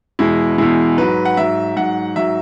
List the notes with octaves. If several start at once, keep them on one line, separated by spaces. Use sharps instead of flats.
E2 B2 G#3 E4
E2 B2 G#3 E4
G#2 F#3 B4
F#5
G#2 F#3 E5
G#2 F#3 F#5
G#2 F#3 E5